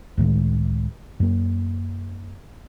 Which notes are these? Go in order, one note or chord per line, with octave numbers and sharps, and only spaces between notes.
C#2 A2 D#3 G#3
F#2 A#3